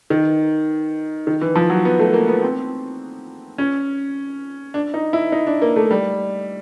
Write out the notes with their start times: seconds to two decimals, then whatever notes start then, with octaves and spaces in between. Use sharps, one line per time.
0.10 D#3
1.27 D#3
1.41 E3
1.55 F3
1.70 F#3
1.85 B3
1.99 A3
2.14 A#3
2.28 B3
2.43 C4
3.58 C#4
4.74 D4
4.94 D#4
5.13 E4
5.32 D#4
5.47 D4
5.62 A#3
5.76 A3
5.91 G3